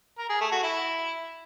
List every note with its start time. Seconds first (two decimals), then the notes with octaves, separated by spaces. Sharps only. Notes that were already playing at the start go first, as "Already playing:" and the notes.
0.18 A#4
0.29 G#4
0.40 A3
0.52 F#4
0.63 E4